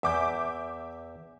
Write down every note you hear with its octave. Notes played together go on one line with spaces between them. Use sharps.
E2 E5 D6 G6